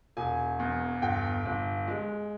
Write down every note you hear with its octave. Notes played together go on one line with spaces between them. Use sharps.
E1 G#5
E2
G1 G5
G1
G#3